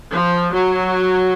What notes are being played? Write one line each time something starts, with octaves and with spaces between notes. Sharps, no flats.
F3
F#3